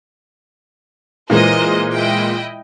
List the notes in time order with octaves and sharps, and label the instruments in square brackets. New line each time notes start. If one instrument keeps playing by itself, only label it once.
[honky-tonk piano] A#2 E3 G#3 [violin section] A#4 C5 D#5
[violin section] E4 D#5 G5